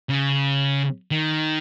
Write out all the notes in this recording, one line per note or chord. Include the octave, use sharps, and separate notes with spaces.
C#3
D#3